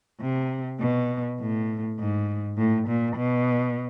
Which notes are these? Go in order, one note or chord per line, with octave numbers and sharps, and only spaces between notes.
C3
B2
A2
G#2
A2
A#2
B2